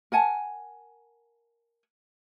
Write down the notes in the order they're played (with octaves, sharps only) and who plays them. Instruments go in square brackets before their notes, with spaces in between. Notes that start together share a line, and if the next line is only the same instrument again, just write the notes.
[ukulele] A#4 F#5 G#5 A5